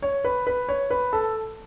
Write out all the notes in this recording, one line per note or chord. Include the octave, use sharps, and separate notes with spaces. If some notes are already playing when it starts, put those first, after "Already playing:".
C#5
B4
B4
C#5
B4
A4